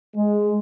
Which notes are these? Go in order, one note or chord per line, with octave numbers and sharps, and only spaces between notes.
G#3